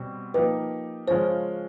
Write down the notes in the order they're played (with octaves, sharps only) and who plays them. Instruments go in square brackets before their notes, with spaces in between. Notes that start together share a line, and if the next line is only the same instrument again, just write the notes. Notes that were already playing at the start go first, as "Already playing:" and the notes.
Already playing: [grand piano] B2 G3 C4
[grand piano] F3 A#3 D#4 G4 [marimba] B4
[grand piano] C#3 F3 G#3 C#4 F4 [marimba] C5